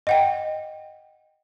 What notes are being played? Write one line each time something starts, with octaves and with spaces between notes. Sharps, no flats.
D#5 F#5 G5